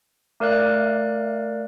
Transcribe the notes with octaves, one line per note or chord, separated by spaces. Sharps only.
A3 A#4 D5 F5 F#6